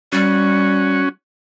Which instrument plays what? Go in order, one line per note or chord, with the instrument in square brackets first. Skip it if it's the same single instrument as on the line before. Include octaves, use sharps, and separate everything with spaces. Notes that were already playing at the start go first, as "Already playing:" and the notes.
[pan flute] G3 [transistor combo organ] C#4 F#4